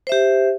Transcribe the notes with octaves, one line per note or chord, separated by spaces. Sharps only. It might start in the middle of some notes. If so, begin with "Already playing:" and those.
G4 C5 E5